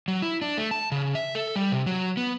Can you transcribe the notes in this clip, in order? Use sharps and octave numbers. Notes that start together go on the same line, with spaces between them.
F#3
E4
D4
A3
A5
C#3
E5
A4
G3
C3
F#3
B3